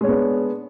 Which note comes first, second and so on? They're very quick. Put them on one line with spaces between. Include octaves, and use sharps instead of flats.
G#3 C#5 D4 B3